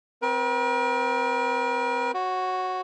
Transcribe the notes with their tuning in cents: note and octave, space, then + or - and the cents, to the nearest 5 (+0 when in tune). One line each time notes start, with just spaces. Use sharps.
C4 -15 A#4 +45
F#4 +0 C#5 -30